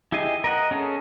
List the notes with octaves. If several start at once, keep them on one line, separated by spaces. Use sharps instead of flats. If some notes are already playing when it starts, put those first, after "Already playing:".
E4 G4 G#4 D#5
A#4 D#5 F#5
C#4 G#4 A4